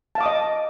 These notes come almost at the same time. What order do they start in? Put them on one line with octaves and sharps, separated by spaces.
A5 F5 D6 D#6 D#5